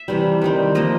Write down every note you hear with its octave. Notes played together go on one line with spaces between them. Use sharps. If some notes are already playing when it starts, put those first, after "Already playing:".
Already playing: E5
C3 E3 G3
D#3 G3 C4
F3 A#3 D#5